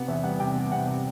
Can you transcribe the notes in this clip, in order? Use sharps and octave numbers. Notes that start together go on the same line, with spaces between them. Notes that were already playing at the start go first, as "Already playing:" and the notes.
Already playing: C3 B3 F#5
E2 E5
G3 F#5
C3 G5
B3
C3 F#5
C3